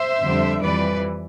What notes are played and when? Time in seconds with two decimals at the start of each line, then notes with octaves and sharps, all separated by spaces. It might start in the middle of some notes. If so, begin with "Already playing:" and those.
Already playing: C5 E5
0.22 F2 D3 G3
0.61 F2 E3 G3 B4 D5